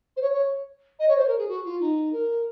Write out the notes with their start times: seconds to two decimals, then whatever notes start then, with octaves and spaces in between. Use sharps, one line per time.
0.17 C5
0.22 C#5
0.32 C#5
0.99 D#5
1.08 C#5
1.17 C5
1.27 A#4
1.38 G#4
1.48 F#4
1.65 F4
1.81 D#4
2.13 A#4